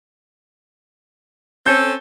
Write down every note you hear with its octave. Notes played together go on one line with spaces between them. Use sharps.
C4 C#4 A4 G6